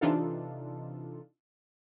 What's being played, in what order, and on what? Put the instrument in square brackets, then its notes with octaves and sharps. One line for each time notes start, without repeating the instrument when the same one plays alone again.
[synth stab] C3 E3 D4 D#4 F4 A4